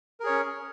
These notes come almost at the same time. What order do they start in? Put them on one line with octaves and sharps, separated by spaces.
A#4 G#4 C#5 C#4